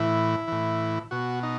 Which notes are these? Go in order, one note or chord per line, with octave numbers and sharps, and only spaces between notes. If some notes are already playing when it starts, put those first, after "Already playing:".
Already playing: A2 E3 E4
A2 E3
B2 F#4
D#4